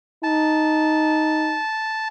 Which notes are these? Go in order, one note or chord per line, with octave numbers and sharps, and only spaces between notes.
D#4 A5